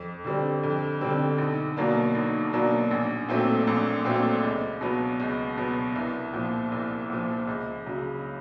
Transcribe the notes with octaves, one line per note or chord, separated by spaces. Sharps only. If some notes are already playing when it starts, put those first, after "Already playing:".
Already playing: F2
D3 G3 C4
F2
D3 G3 C4
B1
B2 F#3 A#3 D4
B1
B2 F#3 A#3 D4
A#1
A#2 F#3 A3 C4
A#1
A#2 F#3 A3 C4
C#2
B2 F#3 B3
C#2
B2 F#3 B3
C2
A#2 F3
C2
A#2 F3
C#2
C#3 F#3